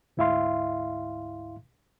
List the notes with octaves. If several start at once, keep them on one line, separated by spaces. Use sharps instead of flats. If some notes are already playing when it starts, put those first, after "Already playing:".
D2 G#2 E4 E5 F5 C6